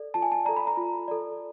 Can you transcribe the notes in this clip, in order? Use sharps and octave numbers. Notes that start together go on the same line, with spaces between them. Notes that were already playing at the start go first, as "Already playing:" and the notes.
Already playing: A4 D5
F4 A5
G#5
A5
A4 D5 A#5
B5
A#5
F4
A4 D5